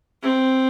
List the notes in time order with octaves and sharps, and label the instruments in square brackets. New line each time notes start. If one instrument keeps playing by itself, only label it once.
[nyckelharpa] C4